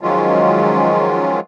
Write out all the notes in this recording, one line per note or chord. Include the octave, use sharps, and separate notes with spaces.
D#3 F3 F#3 G#3 C#4 F4